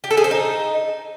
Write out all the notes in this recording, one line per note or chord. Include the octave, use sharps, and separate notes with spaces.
G4
A4
G#4
C5
D#4